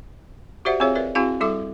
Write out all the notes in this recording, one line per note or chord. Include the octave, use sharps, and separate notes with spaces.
F#4 G4 C5 D5 E5 F#5
C4 F4 G#4 C#5 E5 F5
A#4 B4 D5 E5
C4 E4 F#4 G#4 F5 A5
G3 E4 A4 E5 D6